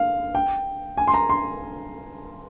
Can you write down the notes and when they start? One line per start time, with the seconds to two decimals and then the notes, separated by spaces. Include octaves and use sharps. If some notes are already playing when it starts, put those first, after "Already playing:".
Already playing: F5
0.35 G5
0.97 G#5
1.07 C6
1.14 A#5
1.29 C6